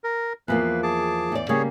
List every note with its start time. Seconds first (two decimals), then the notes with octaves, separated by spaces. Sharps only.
0.04 A#4
0.48 E2 F3 A#3 B4
0.83 G#4 A5 D6
1.32 E2 D5
1.49 C#3 G3 A#3 G#4 C#5